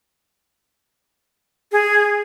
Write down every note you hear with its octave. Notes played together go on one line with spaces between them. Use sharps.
G#4